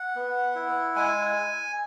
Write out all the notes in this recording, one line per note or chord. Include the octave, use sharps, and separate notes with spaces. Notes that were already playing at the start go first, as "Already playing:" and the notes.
Already playing: F#5
B3
E4
G#3 G#5